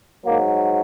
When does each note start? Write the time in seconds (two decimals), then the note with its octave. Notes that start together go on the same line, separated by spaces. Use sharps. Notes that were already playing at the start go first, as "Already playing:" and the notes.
0.25 G#2 F#3 A#3